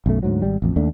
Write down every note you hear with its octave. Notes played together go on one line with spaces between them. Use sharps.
B1 F#2 A3
D2 G#2 F#3
G#1 G3
A1 F2
D#2 A3 D4